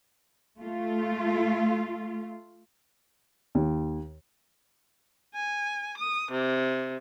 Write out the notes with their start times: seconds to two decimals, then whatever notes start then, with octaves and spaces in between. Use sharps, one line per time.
0.62 A3 F4
3.55 D#2
5.34 G#5
5.98 D#6
6.32 C3